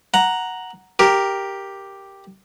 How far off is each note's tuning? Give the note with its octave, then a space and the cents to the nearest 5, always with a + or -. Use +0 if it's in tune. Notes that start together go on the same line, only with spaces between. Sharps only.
F#5 +0 A#5 +0
G4 +0 A#4 +0